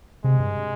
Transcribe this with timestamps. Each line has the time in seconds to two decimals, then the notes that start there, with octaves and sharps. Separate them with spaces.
0.24 C3 G#3
0.39 G2